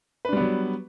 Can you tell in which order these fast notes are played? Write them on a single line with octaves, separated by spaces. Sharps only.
B4 D4 G3 B3 F#3